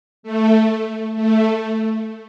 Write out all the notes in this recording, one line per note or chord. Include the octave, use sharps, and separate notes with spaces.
A3
A3